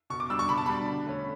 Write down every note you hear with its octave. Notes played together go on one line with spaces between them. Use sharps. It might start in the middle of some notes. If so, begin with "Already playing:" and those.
B2 C#6
D6
G3 D4 E6
C#6
B2 B5
A5
G3 D4 B5
D3
A3 C#4